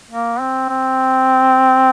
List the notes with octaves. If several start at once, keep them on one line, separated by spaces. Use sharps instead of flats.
A#3
C4
C4